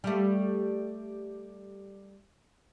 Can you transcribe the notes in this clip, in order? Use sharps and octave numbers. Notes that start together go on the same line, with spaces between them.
G3 A3